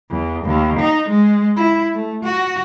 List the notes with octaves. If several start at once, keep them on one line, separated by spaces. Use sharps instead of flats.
E2
D#2
D#4
G#3
E4
A3
F#4